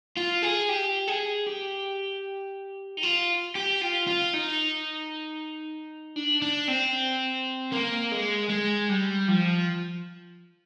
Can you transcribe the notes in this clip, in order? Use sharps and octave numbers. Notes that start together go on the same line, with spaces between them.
F4
G#4
G4
G#4
G4
D#4
F4
G4
F4
F4
D#4
D4
D4
C4
A#3
G#3
G#3
G3
F3